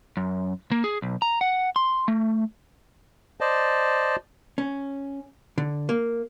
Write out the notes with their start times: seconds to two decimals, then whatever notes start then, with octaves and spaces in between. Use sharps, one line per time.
0.17 F#2
0.71 A#3
0.84 G#4
1.02 B1
1.22 A#5
1.41 F#5
1.76 C6
2.08 A3
3.41 C5 D5 D#5 A5
4.58 C#4
5.58 D3
5.89 A#3